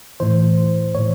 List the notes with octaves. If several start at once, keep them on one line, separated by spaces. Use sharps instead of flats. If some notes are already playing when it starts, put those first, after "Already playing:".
A2 E3 C5
A2 C#5
E3